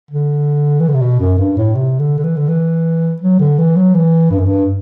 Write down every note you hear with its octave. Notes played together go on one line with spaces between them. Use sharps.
D3
E3
D3
C3
B2
F#2
G2
A2
C3
D3
D3
E3
D3
E3
F#3
D3
E3
F#3
E3
G2
F#2
G2